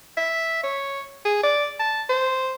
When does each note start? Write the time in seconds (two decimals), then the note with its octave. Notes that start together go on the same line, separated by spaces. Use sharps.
0.17 E5
0.64 C#5
1.25 G#4
1.43 D5
1.80 A5
2.09 C5